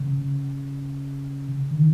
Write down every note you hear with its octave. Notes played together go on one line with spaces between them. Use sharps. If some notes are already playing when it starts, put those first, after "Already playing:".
Already playing: C#3
D3
D#3